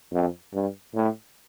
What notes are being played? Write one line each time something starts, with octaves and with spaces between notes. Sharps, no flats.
F2
G2
A2